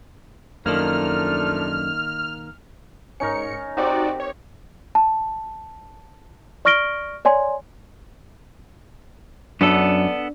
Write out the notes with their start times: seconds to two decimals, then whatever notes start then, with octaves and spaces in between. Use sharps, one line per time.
0.66 F#2 D#3 F3 A3 A#3 D4 F6
3.20 G#2 C#4 D#4 A#4 C#7
3.77 C4 D#4 F#4 G4 D5
4.20 C#5
4.95 A5
6.65 D5 C#6 F6 A#6 D7 G7
7.25 C#5 D5 G#5 C6
9.61 F#2 B3 D4 A4